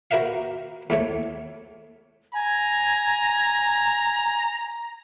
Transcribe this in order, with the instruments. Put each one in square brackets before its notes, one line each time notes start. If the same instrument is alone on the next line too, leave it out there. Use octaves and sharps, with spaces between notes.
[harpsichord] F#4 A#4 B4 E5 F5
E2 A3 C#5
[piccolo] G#5 [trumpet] A#5